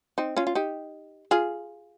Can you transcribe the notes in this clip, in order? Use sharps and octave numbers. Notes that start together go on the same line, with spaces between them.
C4 D#4
C#4 F4
F4
D#4 G4
F4 G#4